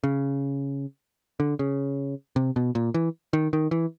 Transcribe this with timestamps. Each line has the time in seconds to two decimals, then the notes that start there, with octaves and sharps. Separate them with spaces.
0.04 C#3
1.40 D3
1.59 C#3
2.36 C3
2.56 B2
2.75 A#2
2.94 E3
3.33 D#3
3.53 D#3
3.71 E3